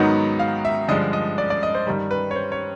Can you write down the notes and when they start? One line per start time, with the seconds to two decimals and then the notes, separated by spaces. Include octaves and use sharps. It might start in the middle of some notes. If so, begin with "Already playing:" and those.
Already playing: G#2 D#3 F#3 B3 D#4 F#5
0.40 F5
0.65 E5
0.89 G2 D3 F3 G#3 D#5
1.13 D#5
1.38 D5
1.50 D5
1.63 D#5
1.75 C5
1.87 G2 D#3 G3
2.11 B4
2.31 C#5
2.36 C5
2.52 C#5